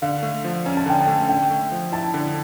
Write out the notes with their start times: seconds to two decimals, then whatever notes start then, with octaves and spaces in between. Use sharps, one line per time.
0.02 D3 F5
0.23 A3
0.44 F3
0.66 C#4 A#5
0.77 A5
0.86 D3 G5
1.00 A5
1.07 A3
1.29 D3 G5
1.51 A3
1.72 F3
1.92 E4 A5
2.14 D3